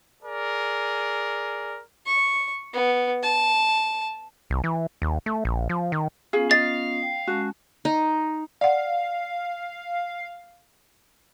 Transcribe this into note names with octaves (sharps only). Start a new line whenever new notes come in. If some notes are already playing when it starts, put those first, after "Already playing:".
G#4 A#4 D5
C#6
B3
A5
C2
E3
D#2
A3
A#1
F3
D#3
B3 C#4 F4 G#4 F5
D#5 F5 A6
G5
G#3 C#4 F#4 A5
D#4
D5 F5 F#5